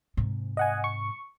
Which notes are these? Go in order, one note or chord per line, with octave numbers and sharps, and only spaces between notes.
G#2 C3
D#5 F#5 G#5
C#6